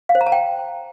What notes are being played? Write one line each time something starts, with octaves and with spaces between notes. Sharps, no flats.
F5
C5
A#5
A5
G5